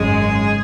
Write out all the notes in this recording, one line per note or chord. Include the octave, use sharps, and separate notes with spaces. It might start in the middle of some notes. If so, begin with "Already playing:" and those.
Already playing: G#1 F#2 C#3 G#3 G#4